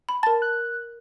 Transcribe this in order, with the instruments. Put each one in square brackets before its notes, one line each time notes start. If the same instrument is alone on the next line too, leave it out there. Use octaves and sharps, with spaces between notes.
[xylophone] B5
[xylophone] A#4 A6 [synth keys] A5
[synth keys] F#6